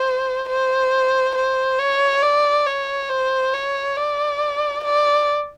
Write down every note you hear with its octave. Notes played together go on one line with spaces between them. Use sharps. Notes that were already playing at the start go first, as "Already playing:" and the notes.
Already playing: C5
C5
C5
C#5
D5
C#5
C5
C#5
D5
D5